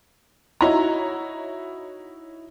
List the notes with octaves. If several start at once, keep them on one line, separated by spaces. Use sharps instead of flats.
D#4 E4 F#4 C#5 A#5